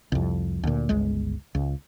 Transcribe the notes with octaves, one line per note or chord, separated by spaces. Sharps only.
C2 F2
D2 A#2
G1 C#2 G#3
C#2